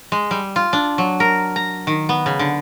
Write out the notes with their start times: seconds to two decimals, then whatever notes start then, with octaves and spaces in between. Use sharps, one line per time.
0.12 G#3
0.31 G3
0.56 F4
0.73 D4
0.98 F#3
1.20 A#4
1.56 A#5
1.87 D#3
2.09 B3
2.26 C#3
2.39 D3